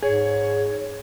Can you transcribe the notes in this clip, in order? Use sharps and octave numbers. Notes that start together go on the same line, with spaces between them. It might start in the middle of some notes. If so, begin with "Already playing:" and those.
G#2 G#4 C#5